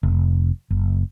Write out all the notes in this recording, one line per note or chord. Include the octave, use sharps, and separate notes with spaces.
F1
F#1